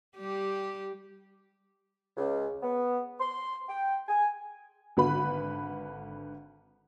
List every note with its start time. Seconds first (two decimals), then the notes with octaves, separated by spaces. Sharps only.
0.16 G3 G4
2.17 C#2
2.63 B3
3.20 C6
3.68 G5
4.08 G#5
4.97 G#1 D3 B4 B5